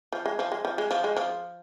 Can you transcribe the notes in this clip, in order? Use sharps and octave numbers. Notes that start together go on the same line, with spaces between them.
F3
G#3
F3
G#3
F3
G#3
F3
G#3
F3